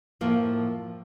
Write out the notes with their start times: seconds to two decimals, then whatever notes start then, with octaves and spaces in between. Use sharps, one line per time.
0.21 A2 F3 A#3